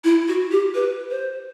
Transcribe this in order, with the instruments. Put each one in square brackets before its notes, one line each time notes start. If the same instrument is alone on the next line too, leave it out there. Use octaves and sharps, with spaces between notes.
[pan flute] E4
F#4
G4
B4
C5